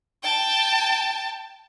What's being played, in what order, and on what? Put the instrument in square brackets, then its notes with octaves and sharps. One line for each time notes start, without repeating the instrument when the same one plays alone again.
[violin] G5 A5